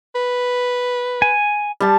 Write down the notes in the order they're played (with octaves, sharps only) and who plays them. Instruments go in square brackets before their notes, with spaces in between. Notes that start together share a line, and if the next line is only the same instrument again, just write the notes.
[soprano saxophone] B4
[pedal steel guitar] G#5
[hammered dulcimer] G3 A5